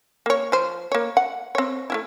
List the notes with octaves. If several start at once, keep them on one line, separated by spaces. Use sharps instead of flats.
A#3 C#5
F3 C5
A#3 C#5
F#5
C4 C#5
A3 C#4 E4